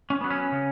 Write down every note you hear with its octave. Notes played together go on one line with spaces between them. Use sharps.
C#4
F#3 B3
C#4
C#3